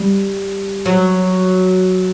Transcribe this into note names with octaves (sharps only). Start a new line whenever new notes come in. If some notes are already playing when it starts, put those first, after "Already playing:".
Already playing: G3
F#3